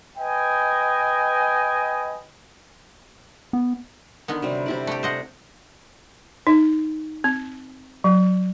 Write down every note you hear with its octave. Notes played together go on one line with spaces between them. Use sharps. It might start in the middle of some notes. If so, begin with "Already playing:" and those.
B4 D#5 G5 G#5
B3
D3 D#3 B3
C3 F#3 G3
C3 E4 D5
A3 G4
C5 D#5 F#5
D#4
C4
F#3